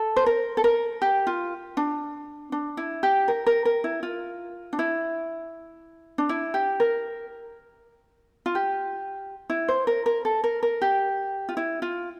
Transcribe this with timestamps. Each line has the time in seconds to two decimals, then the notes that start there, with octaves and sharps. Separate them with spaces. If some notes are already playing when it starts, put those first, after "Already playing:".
Already playing: A4
0.16 C5
0.26 A#4
0.57 A4
0.64 A#4
1.02 G4
1.27 F4
1.77 D4
2.52 D4
2.77 E4
3.03 G4
3.28 A#4
3.46 A#4
3.65 A#4
3.84 E4
4.03 F4
4.73 D4
4.79 E4
6.18 D4
6.29 E4
6.54 G4
6.80 A#4
8.46 F4
8.55 G4
9.50 E4
9.68 C5
9.87 A#4
10.06 A#4
10.25 A4
10.44 A#4
10.63 A#4
10.82 G4
11.49 F4
11.57 E4
11.82 F4